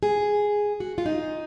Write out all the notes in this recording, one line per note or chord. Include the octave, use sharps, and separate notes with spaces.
G#4
F#4
F4
D#4